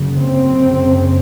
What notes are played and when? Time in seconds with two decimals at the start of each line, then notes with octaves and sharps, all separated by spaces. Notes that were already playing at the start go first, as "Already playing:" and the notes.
Already playing: F#1 F#2 C#3
0.16 C4
0.63 F#1 F#2 C#3